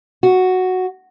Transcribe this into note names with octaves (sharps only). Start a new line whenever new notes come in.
F#4